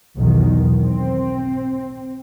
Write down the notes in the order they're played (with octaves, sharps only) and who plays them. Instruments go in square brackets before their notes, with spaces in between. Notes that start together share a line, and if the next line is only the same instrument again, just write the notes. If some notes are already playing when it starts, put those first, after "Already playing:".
[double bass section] B1 E2 B2 D#3
C4